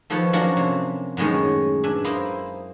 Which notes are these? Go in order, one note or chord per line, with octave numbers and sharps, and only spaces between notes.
D#3 F3 A4 B4 C#5
F3 F#3 A#3 C#4 D4 F#4
C3
F#2 A2 D#3 G#3 C#4
D4 E5 G#5
A#3 E4 C5 D#5